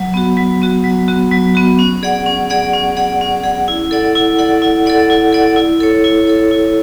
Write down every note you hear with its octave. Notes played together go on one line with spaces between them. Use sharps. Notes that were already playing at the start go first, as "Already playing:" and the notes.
Already playing: F#3
B3 F#4
F#3
B3 F#4
F#3
B3 F#4
F#3
B3 F#4
C#4
G#4 D5 F#5
C#4
G#4 D5 F#5
C#4
G#4 D5 F#5
C#4
G#4 D5 F#5
E4
A4 D5 F#5
E4
A4 D5 F#5
E4
A4 D5 F#5
E4
A4 D5 F#5
E4
A4 C#5
E4
A4 C#5
E4